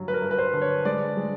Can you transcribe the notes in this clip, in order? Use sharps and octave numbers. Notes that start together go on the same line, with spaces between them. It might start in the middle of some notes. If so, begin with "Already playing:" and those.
Already playing: G2 D3 F#3
B4
A#4
G2
B4
C5
D3
C#5
G#3 D5
G#3